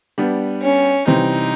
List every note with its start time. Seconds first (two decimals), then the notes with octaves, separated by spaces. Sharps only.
0.18 G3 B3 D4
0.62 C#4
1.07 C3 E3 G3 C4 D#4